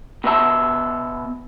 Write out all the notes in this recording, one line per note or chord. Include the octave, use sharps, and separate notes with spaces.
B2 B3 E5 A5